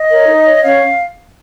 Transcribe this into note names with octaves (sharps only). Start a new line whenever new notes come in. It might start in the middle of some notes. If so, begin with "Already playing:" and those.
Already playing: D#5
A#4 C#5
D#4
C#5
C#4 C#5 F5